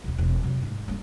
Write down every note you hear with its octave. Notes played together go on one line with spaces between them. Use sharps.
E1 E2
E1 C4
C3 F#3
G#2
G3 A#3